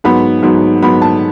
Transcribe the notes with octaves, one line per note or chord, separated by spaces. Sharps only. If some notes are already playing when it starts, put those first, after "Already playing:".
G#2 F#3 B3 B5
G#2 F#3 B3
G#2 F#3 B3 B5
A5